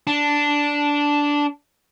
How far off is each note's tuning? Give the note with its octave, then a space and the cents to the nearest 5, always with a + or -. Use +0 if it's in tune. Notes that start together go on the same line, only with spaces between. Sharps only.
D4 -10 A5 +0